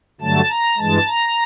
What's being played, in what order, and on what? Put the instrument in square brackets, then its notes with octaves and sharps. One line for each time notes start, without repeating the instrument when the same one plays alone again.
[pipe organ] G2 D3 F#3 A3 A5
A#5
G2 E3 G#3 A5
A#5